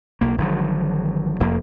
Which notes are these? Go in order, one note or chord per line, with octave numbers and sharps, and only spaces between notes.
B1 A#3
G#1 D3 F3 F#3
F1 F2 A#3